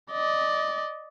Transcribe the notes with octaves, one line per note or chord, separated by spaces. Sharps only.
D5 D#5